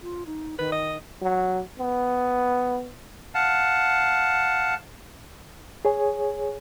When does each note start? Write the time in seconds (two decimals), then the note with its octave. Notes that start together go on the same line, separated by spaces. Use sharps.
0.01 F4
0.26 D#4
0.59 D#3 B4
0.72 D#5
1.22 F#3
1.79 B3
3.35 F5 F#5 A5
5.85 G#4 C#5 G#5